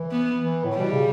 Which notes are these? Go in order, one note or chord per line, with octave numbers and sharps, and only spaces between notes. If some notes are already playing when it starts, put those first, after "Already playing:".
Already playing: E3
B3
E3
A2
G3
B2
C#3